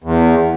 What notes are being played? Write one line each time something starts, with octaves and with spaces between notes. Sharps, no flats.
E2